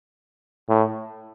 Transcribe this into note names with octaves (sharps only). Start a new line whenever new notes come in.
A2